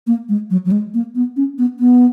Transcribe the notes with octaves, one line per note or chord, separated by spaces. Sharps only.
A#3
G#3
F#3
F#3
G#3
A#3
B3
C#4
B3
B3